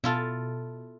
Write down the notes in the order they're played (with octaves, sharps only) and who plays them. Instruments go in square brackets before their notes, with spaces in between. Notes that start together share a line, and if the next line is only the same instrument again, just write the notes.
[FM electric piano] B2 [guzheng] E4 F4 A4